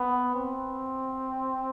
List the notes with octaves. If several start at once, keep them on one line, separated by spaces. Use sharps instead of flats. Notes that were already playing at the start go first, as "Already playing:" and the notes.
Already playing: B3
C4